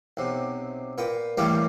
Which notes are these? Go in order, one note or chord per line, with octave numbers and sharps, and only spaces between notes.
B1 C3
A#2 B4 G5
A2 C#3 E3 G3 A#3 G4